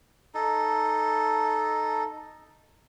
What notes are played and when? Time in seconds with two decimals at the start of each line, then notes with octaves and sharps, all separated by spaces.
0.34 D#4 A4